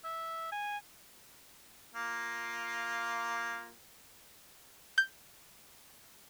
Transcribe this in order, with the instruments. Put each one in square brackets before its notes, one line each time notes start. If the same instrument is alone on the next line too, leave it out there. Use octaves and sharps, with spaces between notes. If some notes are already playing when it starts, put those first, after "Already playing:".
[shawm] E5
G#5
[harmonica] A#3 F4
[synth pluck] G6